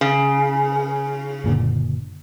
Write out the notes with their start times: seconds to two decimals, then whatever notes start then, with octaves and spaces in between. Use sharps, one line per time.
0.01 C#3
1.44 F#1 A#2 D3